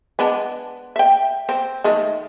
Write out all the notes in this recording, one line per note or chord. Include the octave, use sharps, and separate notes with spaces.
G#3 B3 D4
E5 G5
C4
D#3 G#3 A3